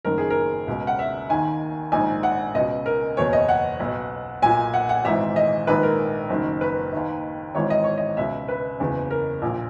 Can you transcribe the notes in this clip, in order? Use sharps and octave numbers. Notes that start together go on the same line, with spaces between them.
F#1 F#2 D#3 A#4
G#4
A#4
C#2 B2
F#5
E5
D#2 D#3 G#5
A#1 G#2 D#3 G#5
F#5
C#2 B2 D#5
A#4
F#1 E2 B2 C#5
D#5
F#5
B1 B2
B1 A#2 G#5
F#5
F#5
G#1 G#2 E3 E5
D#5
A#1 G#2 D#3 B4
A#4
F#1 F#2 D#3
B4
D#2 D#3
G#1 G#2 E3 C#5
D#5
C#5
D#5
C#2 B2 E5
B4
F#1 E2 C#3 E3
A#4
A#1 A#2